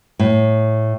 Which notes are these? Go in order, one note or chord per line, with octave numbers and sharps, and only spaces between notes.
A2